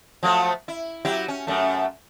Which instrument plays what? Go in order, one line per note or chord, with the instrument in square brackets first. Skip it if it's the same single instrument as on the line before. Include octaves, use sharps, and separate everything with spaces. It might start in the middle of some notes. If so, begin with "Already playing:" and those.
[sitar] F3 F#3 A3
E4
F#3 E4 G4
C#4
F#2 A3